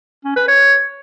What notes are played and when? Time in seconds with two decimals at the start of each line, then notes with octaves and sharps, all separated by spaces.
0.25 C#4
0.36 B4
0.48 C#5